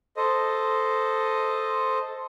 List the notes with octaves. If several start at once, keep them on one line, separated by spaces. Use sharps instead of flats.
A4 C5 D#5